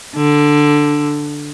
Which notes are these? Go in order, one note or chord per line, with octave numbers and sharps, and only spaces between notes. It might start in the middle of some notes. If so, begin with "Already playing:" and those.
D3